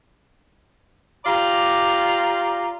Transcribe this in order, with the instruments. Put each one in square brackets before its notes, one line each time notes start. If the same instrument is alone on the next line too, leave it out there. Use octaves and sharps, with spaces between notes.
[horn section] F4 G4 D5 A#5